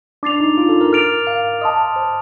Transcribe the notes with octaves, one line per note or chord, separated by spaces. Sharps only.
D4 D6 A6 C7 F7
D#4
F4
A4
A#4
D6 F6 A6 D7 F7
F5
D#5 A5 C6 D#6
C5